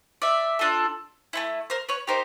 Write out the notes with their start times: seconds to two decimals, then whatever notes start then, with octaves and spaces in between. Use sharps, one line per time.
0.22 D5 E5
0.59 D4 F4 A4
1.33 A3 C4 E4
1.70 A#4 C5
1.89 B4 C#5
2.07 D#4 G4 A#4 C5